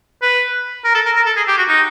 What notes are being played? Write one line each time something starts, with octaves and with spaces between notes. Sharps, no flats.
B4
A#4
A4
A#4
A#4
A4
G#4
G4
F#4
D#4